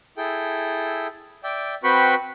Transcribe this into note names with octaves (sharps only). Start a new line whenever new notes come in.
E4 G#4 A4 G5
D5 E5 G5
C4 F#4 B4 G5 B5 C#6